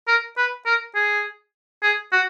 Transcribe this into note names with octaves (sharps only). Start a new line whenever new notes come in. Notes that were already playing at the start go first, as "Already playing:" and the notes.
A#4
B4
A#4
G#4
G#4
F#4